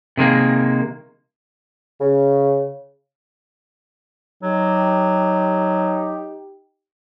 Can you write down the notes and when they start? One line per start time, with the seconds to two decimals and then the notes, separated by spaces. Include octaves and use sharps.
0.17 C3 D#3 G#3 A#3
2.00 C#3
4.43 F#3 D#4 G4